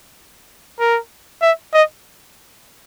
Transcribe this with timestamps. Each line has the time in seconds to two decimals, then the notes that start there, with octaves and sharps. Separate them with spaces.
0.80 A#4
1.42 E5
1.73 D#5